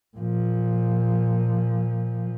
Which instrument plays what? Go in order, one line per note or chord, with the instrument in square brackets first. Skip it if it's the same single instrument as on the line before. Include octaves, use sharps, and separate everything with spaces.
[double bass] A#2 F3